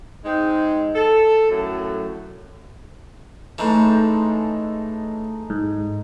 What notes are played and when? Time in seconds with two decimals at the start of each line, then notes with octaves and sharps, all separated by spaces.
0.24 G#3 C4 D#4
0.95 A4
1.49 F#2 A2 F#3
3.58 A2 E3 G#3 D#4 A4
5.50 G#2